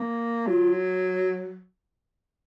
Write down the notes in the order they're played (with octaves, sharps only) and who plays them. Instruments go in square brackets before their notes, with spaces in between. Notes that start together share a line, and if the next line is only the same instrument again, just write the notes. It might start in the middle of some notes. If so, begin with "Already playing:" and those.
Already playing: [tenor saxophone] A#3
[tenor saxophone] F#3 [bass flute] F4